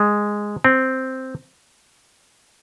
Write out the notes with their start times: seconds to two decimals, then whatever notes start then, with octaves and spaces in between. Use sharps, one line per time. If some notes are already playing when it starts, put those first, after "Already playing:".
Already playing: G#3
0.64 C4